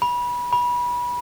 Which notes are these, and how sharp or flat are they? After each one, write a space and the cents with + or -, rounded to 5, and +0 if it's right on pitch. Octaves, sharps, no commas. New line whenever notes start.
B5 -25
B5 -25